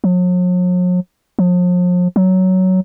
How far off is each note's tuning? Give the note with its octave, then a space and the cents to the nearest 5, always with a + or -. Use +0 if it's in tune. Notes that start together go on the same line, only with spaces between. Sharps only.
F#3 -45
F3 +40
F#3 +10